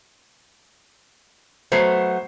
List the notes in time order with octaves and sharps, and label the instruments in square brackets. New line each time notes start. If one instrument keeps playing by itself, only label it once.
[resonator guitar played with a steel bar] F#3 A3 B3 [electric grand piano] C5 C7